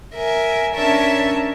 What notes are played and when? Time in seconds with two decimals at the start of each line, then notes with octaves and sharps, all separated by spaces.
0.15 A#4 E5 G#5
0.74 C#4 D4 A#4 C#5 E5 A5